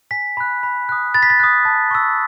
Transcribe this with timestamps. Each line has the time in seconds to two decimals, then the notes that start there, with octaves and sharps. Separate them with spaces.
0.11 G#5 B6
0.37 B5 F#6
0.63 B5
0.89 D#6 F#6
1.15 B5 A6
1.23 B6
1.30 A6
1.40 D#6 F#6
1.65 A5
1.91 C#6 E6